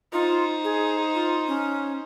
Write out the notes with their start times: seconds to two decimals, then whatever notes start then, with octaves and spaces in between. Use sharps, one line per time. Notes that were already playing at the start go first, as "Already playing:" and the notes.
0.13 D#4 F4 C5
0.64 G#4
1.15 F4
1.48 C#4